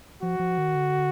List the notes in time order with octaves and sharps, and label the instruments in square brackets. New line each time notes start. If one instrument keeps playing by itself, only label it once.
[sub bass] F3 [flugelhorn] F#4
[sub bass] F3
D#3
D3